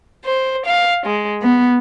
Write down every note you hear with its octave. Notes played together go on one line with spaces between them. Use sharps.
C5
F5
G#3
B3